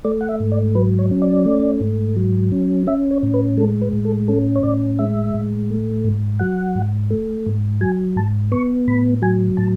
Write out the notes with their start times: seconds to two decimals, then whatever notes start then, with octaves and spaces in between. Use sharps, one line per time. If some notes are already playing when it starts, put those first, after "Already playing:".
0.05 A3 D5
0.21 F#5
0.29 E5
0.40 G#2
0.52 D5
0.75 F#3 B4
0.99 C#5
1.11 C#4
1.22 D5
1.45 A3
1.81 G#2
2.16 F#3
2.52 C#4
2.87 C#4 E5
3.11 C#5
3.23 A2
3.34 B4
3.57 G#3 A4
3.82 B4
3.93 A2
4.05 A4
4.28 C#4 A4
4.56 C#5
4.63 A2 D5
4.99 G#3 E5
5.34 A2
5.70 A3
6.04 G#2
6.39 F#3 F#5
6.75 G#2
7.11 A3
7.46 G#2
7.81 F#3 G#5
8.16 G#2 A5
8.52 B3 C#6
8.88 A2 B5
9.22 F#3 G#5
9.57 A2 A5